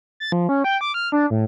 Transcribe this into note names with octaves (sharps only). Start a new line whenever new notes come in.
A6
F3
C#4
G5
D6
F6
D4
A2